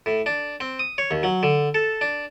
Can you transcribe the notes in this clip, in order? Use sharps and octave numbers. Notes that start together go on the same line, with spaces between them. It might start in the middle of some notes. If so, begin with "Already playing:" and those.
A2
D4
C4
D#6
C#5
D#2
F#3
D3
A4
D4